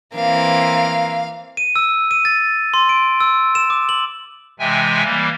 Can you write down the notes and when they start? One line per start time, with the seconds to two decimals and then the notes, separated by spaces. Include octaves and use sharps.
0.15 E3 A#3 C4 F5
1.57 D#7
1.76 E6
2.11 D#7
2.25 A6
2.74 C6
2.89 D7
3.20 E6
3.55 E7
3.70 D6
3.89 F#7
4.59 C3 E3 G#3 E5 G5 G#5
5.04 E3 G3 A#3